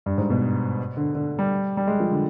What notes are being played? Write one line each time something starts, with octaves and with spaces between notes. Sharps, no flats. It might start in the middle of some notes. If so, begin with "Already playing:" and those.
G2
G#2
B2
D3
D3
G3
G3
G#3
F3
D3